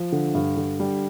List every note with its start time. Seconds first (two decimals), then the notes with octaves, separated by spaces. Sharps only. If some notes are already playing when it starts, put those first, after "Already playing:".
Already playing: F3
0.12 D3
0.34 G2
0.57 D3
0.80 G3